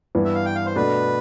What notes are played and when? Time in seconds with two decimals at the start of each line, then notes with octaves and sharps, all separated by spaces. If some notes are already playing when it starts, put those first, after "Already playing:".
0.15 G2 E3 B3
0.25 E5
0.35 F5
0.45 G5
0.55 F5
0.66 C5
0.75 B2 A3 D4 B4